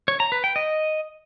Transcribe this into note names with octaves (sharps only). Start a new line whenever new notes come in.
C#5
A#5
B4
G5
D#5